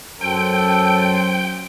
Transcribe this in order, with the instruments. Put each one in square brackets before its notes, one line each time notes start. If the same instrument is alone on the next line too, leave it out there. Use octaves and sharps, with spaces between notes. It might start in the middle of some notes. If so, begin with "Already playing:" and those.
[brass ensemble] F#2 C5 [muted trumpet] A4 [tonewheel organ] G5